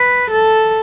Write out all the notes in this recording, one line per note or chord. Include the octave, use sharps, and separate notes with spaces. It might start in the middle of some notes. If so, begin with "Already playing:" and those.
Already playing: B4
A4